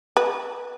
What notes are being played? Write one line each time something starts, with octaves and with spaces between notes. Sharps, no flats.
B4